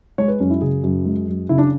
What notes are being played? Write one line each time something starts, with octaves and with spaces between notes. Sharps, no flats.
G#3 C#5
B4
F#2 C#4
E4
C#3 G#4
F#2
G#3
F#2
C#3 E4
D4